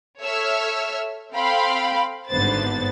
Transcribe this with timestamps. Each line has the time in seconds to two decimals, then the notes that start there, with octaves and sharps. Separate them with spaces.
0.21 A4 C#5 E5 E6 F6
1.34 C4 A4 F5 G5 B5 C6
2.29 G#1 G2 D3 B3 C5 A6